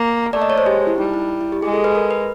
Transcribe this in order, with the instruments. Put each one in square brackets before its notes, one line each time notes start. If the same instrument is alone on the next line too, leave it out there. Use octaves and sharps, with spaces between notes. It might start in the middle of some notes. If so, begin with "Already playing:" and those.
Already playing: [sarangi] A#3
[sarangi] A3 [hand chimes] D5
[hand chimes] D#5
C#5
C5
[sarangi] G#3 [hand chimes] G4
[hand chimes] E4
[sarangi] G3 [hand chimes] D#4
[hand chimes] E4
E4
G4
[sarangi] G#3 [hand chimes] G#4
[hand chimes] A4
B4
A#4
B4